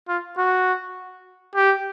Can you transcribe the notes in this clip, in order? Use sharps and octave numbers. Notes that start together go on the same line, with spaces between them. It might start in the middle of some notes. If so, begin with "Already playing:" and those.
F4
F#4
G4